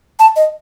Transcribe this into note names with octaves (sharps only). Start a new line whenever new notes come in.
A5
D#5